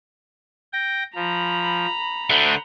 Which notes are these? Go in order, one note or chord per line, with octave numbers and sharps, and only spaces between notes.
G5 A#6
F3 A#5 B5
D3 A3 C5 F#5 F#6